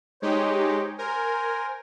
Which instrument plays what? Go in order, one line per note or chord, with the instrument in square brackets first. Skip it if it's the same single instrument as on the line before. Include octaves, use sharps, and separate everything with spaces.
[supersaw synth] G#3 D#4 G4 [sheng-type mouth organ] C5 C#5
[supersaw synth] A#4 [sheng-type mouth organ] C5 G#5